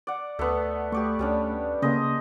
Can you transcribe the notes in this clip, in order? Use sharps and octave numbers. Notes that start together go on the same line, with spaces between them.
D5 F#5
D2 A3 B3
A3 G4 D5 C#6
D2 G3 C#4 D4
C#3 A#3 C#4 G#4 C5 D#5